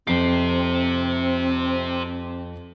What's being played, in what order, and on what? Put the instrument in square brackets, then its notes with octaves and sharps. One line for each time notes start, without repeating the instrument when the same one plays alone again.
[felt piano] F2 C7 [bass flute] C4 [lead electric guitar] G4 C5